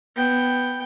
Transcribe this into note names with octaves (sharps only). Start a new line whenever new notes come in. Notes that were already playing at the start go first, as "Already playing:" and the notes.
B3 G5